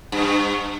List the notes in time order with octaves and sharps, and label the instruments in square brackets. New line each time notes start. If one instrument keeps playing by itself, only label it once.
[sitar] G2